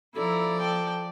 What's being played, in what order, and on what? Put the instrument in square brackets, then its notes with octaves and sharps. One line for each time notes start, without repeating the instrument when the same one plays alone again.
[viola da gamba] F3 D5 [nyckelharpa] E4 A#5 [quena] A4
[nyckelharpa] G5 A5